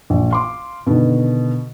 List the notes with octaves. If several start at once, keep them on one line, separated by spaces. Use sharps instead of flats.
A#1
F5 C6 D6
B2 D3 D#3